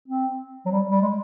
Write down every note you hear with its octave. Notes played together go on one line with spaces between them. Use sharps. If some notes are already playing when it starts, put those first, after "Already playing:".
C4
F#3
G3
G3
G#3